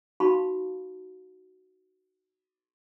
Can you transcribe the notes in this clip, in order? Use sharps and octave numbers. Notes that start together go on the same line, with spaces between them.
D#4 F#4 F5 A5 B5 C#6